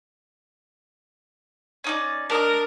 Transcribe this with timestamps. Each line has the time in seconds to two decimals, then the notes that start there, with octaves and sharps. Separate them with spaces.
1.84 C#4 D#4 D5
2.30 D4 A#4 D5 D#5